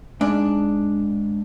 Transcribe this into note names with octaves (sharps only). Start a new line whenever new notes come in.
G#2 D4